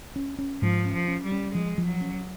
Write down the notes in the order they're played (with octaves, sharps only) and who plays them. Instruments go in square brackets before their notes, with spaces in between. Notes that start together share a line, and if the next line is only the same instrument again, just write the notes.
[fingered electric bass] C#4
C#4
[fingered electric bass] G#2 [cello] F3
[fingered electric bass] C#4
[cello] F3
[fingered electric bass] C#4
[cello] G3
[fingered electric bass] C#4
[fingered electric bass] F3 [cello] G#3
[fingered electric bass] F3
[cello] F#3
[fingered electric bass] C#4